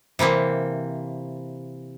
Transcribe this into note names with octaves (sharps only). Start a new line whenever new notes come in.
C3 E3 A#3 C4